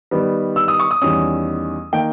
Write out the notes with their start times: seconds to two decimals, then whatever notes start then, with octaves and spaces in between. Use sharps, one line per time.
0.11 D#3 G3 B3
0.56 E6
0.68 D#6
0.79 C#6
0.91 D#6
1.02 E2 D#3 G3 C#4 D#6
1.93 D#3 A#3 G5